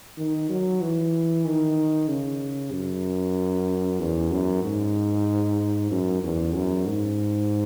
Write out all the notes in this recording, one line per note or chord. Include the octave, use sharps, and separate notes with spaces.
D#3
F#3
E3
D#3
C#3
F#2
E2
F#2
G#2
F#2
E2
F#2
G#2